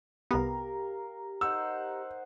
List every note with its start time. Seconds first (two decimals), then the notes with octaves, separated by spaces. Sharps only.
0.31 C2 B3 G4 A#4 F5 A#5
1.41 D#4 C5 F#5 E6